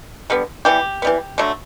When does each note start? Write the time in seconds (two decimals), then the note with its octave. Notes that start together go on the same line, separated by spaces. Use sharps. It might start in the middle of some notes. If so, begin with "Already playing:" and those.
0.30 D3 G3 B3
0.65 E3 G3 B3 G4
1.02 E3 G3 B3
1.38 D3 F#3 A3